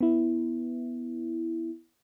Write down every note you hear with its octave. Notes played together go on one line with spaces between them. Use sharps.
B3 E4